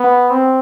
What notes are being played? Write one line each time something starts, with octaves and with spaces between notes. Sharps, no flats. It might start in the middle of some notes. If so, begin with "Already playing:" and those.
Already playing: B3
C4